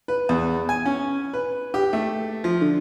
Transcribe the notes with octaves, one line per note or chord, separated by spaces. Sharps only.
B4
E2
G#5
C#4
B4
G4
A3
F3
D3